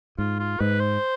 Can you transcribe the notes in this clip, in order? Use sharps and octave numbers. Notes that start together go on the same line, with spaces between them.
G#2 F4
F4
G#2 B4
C5